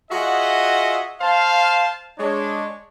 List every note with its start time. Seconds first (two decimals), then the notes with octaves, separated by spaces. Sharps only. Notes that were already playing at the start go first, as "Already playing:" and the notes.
0.11 F4 F#4 G#4 D#5 E5 F#5
1.21 C5 F5 A5
2.18 G#3 D4 C#5